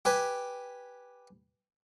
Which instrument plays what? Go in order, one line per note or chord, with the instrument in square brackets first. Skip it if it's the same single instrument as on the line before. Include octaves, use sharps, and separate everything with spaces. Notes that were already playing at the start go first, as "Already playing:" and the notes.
[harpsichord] G4 B4 G#5